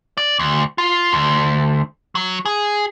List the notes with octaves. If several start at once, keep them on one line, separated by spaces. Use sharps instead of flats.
D5
D2
F4
D2
F#3
G#4